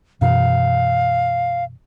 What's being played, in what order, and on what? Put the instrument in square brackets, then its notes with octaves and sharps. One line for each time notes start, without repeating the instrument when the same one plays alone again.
[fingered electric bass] F#2 B2 E3 [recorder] F5